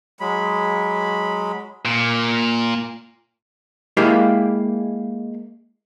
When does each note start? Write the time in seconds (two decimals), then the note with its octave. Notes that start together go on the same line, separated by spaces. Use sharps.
0.20 F#3 G#3 B5
1.85 A#2
3.97 G#3 A#3 E4 G4 F5